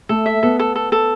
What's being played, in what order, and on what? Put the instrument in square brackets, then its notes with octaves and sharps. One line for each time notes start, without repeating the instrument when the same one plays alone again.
[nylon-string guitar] A3 [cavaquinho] A4
[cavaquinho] E5
[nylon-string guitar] B3 [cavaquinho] A4
[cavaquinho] A4
A4
A4